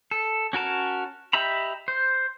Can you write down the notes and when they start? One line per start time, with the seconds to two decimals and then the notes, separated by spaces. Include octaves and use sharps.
0.11 A4
0.53 C#4 F#4 A#4 A5
1.33 G4 D#5 E5 A#5 B5
1.88 C5